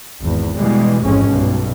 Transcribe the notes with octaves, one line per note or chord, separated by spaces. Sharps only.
G#1 E2
B2 E3 G3 G#3
A1 F2 G#2 G#3 C#4
B1 G2 B2